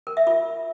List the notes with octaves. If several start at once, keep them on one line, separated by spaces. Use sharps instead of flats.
A#4
E5
F4